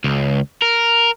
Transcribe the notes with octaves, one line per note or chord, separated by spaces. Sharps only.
C#2
A#4